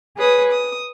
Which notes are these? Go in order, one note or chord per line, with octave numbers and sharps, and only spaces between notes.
G#4 B4 C#5 D#6
D#6